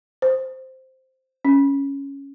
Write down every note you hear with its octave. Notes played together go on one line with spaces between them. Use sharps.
C5
C#4